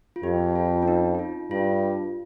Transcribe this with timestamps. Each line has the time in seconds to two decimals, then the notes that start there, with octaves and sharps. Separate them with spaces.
0.16 F4
0.23 F2 G4
0.56 F4
0.82 C#4
0.88 D#4
1.15 D#4
1.19 F4
1.51 G2 F4